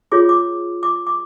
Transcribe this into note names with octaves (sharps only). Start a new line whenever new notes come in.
F4 G#4 C#5 D6
D6
D6
D6